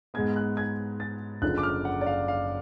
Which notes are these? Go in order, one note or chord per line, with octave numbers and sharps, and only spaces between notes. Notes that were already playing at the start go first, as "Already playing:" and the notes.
G#2 G#3 B3 G#6
F#6
G#6
A6
F#1 F#2 D3 F3 F#6
D6
F6
F#5
D5
F5
F5